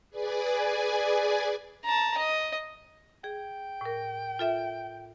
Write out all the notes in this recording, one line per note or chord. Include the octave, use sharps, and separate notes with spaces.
G#4 B4 D5 G#5
A5 A#5
D#5
G#4 G5
A2 A#4
F4 A4 E5